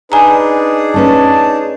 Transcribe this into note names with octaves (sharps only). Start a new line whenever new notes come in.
D4 D#4 G#4 B4 G#5 A#5
A3 C#4 B4 A5